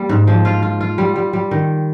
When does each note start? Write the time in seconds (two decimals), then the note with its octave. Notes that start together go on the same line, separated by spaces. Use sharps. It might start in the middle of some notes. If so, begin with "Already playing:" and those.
Already playing: G3 A#3
0.09 G#2
0.27 F3
0.45 F4
0.63 F4
0.81 F4
0.98 G3
1.16 G3
1.33 G3
1.51 D#3